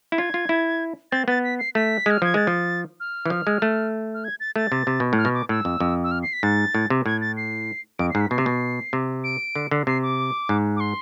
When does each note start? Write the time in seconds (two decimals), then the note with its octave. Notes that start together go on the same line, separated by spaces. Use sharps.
0.12 E4
0.18 F4 G#6
0.34 F4
0.49 E4
1.12 C4 A6
1.28 B3 A6
1.44 B6
1.59 C7
1.75 A3 B6
2.06 G#3 F6
2.22 F3 G#6
2.34 G#3 A6
2.47 F3
3.00 F6
3.26 E3
3.30 F3
3.47 G#3
3.62 A3
4.14 F6
4.24 G#6
4.40 A6
4.56 A3 A6
4.72 C3
4.87 C3
5.00 B2
5.13 A2
5.18 F6
5.25 B2
5.34 D6
5.49 A2 E6
5.65 F2
5.80 F2
6.04 E6
6.11 F6
6.23 C7
6.33 B6
6.43 G#2 A6
6.75 A2
6.90 C3
7.06 A2 G#6
7.21 A6
7.37 C7
7.99 F2 D7
8.10 C7
8.15 G#2
8.21 B6
8.30 B2 C7
8.38 C3
8.46 B2
8.93 C3
9.24 D7
9.55 D3
9.71 D3
9.87 C3 C7
10.02 D6
10.49 G#2
10.76 D6
10.80 C6